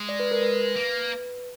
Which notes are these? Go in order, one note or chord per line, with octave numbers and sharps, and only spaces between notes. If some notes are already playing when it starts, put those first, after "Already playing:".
Already playing: G#3
D5
B4
A#4
B4
A#3